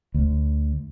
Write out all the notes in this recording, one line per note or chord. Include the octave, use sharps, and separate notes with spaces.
D2